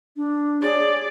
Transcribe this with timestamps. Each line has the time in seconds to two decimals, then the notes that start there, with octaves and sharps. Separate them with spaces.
0.17 D4
0.62 G#4 C#5 D5